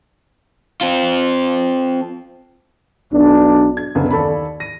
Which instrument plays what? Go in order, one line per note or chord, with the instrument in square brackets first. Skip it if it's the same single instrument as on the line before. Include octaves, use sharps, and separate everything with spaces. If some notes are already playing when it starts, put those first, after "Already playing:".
[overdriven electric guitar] C4 F4
[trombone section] B1 D4
[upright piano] G#6
C#2 F#2 D3 B3
D#2 A4 D5 B5
A#6 D#7